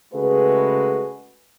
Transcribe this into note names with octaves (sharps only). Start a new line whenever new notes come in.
C#3 G#3 A3 F#4 G#4 B4